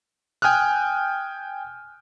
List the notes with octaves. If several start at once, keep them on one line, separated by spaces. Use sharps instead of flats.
G5 G#5 D#6 F6 F#6